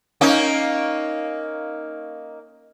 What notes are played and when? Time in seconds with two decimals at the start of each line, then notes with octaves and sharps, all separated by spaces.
0.21 A#3 C#4 D#4